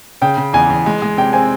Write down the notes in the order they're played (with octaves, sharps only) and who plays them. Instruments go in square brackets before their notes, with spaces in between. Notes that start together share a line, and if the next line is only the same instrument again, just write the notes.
[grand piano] C#3 [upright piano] G5
[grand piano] C#3
[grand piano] E2 [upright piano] G#5
[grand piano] E2
G#3
G#3
[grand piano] C3 [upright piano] G5
[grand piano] C4 [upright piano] G#5